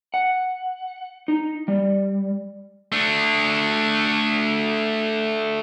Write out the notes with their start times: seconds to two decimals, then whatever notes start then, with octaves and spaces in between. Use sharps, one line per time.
0.14 F#5
1.28 D#4
1.68 G3
2.92 A3 D4